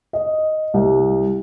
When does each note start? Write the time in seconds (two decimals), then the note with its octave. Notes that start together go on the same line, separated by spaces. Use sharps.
0.13 D#5
0.74 C2